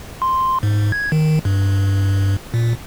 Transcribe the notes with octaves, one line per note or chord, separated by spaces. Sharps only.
C6
G#2
G#6
D#3
G2
A#2